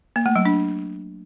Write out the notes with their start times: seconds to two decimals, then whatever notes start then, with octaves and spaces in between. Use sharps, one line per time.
0.16 A#3
0.26 A3
0.36 F#3
0.45 D4